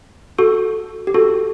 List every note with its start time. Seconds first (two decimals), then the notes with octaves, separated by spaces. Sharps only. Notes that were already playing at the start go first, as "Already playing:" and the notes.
0.38 F#4 A4
1.07 G4
1.14 F#4 A4